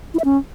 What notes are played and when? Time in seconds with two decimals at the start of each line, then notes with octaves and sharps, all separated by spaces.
0.14 E4
0.19 E5
0.25 C#4